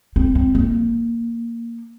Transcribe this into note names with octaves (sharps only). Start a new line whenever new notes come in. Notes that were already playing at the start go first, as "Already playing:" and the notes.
C4
C4
A#3